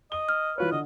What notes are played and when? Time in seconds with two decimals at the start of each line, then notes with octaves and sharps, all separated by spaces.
0.12 D#5 G7
0.29 F6
0.58 E3 F4 B4 C#5
0.72 D3 D#5